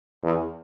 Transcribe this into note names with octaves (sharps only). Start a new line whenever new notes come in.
E2